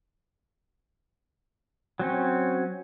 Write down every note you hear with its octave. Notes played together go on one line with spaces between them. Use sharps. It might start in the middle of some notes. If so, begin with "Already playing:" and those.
F#3 C4 C#4